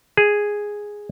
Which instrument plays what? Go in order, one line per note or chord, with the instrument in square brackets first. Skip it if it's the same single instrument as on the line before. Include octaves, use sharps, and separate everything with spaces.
[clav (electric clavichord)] G#4